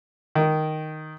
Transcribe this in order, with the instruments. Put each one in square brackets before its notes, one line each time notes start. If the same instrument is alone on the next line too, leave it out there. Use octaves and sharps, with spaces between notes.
[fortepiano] D#3